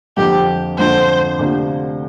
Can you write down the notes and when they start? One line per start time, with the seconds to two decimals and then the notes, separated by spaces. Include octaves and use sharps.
0.17 F2 D3 F3 A#3 G4
0.78 F2 D3 F3 A#3 C5
1.39 D2 C3 A#3 D4 F4